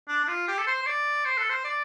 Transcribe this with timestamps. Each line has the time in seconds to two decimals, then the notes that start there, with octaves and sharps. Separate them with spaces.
0.08 D4
0.24 D4
0.28 F4
0.48 G4
0.58 A4
0.67 C5
0.82 C5
0.86 D5
1.25 C5
1.37 A4
1.49 C5
1.65 D5